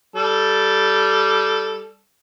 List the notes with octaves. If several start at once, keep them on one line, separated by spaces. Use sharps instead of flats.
G3 A4